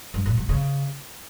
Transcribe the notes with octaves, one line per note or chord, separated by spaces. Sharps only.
G2
A#2
B2
C#3